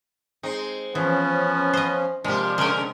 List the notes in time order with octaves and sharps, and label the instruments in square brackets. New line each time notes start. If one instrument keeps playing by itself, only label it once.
[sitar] G#3 C4 [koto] D#4
[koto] E3 [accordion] F3 C#4 [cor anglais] B3
[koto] C5 D#5
[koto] C3 G#3 [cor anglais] F3 [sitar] A#3 G4 [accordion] D4
[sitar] C#3 C#4 A#4 [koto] G#3 G5